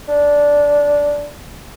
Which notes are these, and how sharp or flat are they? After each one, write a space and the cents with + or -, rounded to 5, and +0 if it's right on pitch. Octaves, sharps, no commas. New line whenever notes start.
D4 -10